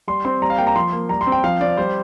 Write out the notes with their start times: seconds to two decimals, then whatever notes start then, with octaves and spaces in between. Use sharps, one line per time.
0.07 G3 C6
0.25 C4 C6
0.42 G3 A#5
0.50 F5
0.58 A#3 G5
0.67 A#5
0.76 F3 C6
0.93 A#3
1.09 G3 A#5
1.21 C6
1.27 C4
1.32 G5
1.44 F3 F5
1.61 C4 D5
1.77 G3 C5